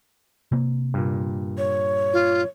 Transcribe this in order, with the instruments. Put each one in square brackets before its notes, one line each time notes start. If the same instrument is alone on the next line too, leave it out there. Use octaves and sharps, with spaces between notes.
[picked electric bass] C3 A#3
[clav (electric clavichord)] G2 A#2
[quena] C#5
[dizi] F4